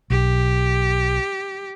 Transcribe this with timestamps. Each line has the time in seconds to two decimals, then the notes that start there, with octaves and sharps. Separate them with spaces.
0.10 B1 G4